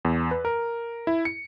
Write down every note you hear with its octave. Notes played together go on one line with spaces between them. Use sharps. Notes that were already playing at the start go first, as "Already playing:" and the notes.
E2
B4
A#4
E4
C#7